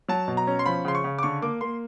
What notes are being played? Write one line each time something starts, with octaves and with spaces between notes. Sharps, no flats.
F#3 A5
B2
A#5
C#4
C6
F3 B5
C#3 C6
C#6
C#3
D6
D3 C#6
A#3 D6
A#3 C6